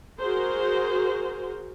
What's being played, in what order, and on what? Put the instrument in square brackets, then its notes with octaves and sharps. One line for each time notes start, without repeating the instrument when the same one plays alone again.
[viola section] F#4 G#4 A#4 C5